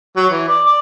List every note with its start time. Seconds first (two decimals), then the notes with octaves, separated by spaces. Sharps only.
0.16 F#3
0.31 E3
0.48 D5
0.66 D5